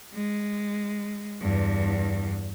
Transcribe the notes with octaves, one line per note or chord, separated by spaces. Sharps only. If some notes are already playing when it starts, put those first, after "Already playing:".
G#3
E2 G2